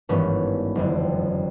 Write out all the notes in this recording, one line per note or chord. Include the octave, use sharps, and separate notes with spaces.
G#1 G2 E3 B3 C#4
F#1 F2 D3